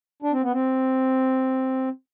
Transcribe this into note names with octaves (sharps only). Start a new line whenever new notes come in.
D4
C4
B3
C4